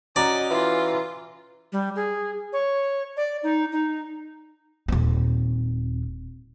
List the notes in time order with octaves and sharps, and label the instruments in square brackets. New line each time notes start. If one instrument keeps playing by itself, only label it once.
[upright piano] C#4 F#4 A#5 [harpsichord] D5 [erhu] D#5
[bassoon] E3 [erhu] F4
[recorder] G3
G#4
C#5
D5
D#4
D#4
[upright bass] D#1 C4